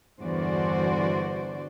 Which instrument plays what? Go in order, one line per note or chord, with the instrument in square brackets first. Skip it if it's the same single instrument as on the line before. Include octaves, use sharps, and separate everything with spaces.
[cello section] E2 G2 D3 F#4 C5 D5